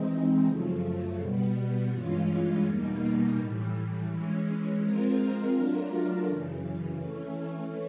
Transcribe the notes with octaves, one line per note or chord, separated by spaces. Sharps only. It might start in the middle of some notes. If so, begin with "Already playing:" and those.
Already playing: E3 G#3 C4 D#4
F#2 C#3 F3 A3
B2 G3 B3
G2 E3 G#3 C#4 F4
E2 B2 G3 A#3 D#4
A2 E3 G3
E3 G#3 C#4
F3 G#3 C4 F4 A#4
F#3 A3 D4 F4 A#4
F#2 C#3 E3
E3 A3 C#4